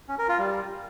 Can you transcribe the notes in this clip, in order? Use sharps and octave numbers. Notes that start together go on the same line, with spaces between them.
C#4
A#4
F4
G3